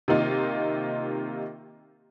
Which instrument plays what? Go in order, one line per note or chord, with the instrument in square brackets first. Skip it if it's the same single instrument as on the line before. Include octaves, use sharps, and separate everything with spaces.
[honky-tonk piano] C3 D#3 A#3 D#4 F4